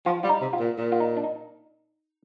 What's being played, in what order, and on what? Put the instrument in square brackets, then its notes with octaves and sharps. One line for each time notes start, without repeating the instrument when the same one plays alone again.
[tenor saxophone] F3 [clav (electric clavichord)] F4
[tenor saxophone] G3 [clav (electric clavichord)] F4
[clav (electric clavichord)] D#4
[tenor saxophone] C3
[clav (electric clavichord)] F4
[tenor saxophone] A#2
A#2
[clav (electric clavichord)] F4
D#4
D4
D#4